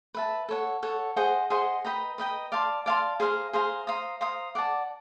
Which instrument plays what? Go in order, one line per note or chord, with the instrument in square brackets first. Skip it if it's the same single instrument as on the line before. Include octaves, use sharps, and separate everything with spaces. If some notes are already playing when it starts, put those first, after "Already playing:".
[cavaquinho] B4 E5 A5
A4 C#5 F#5
A4 C#5 F#5
G#4 C5 D#5 F#5
G#4 C5 D#5 F#5
B4 D#5 G5 A#5
B4 D#5 G5 A#5
D5 F5 A5 C6
D5 F5 A5 C6
G#4 C5 F5 A#5
G#4 C5 F5 A#5
C5 F5 A#5 D#6
C5 F5 A#5 D#6
D5 F#5 A5